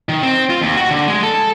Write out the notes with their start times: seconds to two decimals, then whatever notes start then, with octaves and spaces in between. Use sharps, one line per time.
0.09 D#3
0.23 C4
0.50 F4
0.61 D#2
0.77 F#4
0.91 D3
1.08 G#3
1.23 A4